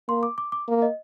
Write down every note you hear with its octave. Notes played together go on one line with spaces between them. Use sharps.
A#3 C6
D6
D6
D6
A#3
D#5